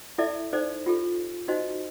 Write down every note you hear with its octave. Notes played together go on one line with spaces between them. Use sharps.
E4 A4 D5 E5
D#4 A4 C5 D5
F4 G4 A4
D#4 F#4 C5 D#5